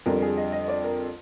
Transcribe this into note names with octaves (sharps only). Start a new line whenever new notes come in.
F2 D3 G3 A#4
G#4
D#5
D#5
D5
A#4